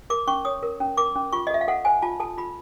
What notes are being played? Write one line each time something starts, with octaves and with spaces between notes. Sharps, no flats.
A#4 D6
C#4 C#6
C#5 D#6
A#4
C#4
A#4 D6
C#4
F4 C#6
D#5
A4 E5
F5
A4 F#5
C5 G#5
F4 A5
A4 A5
F4 B5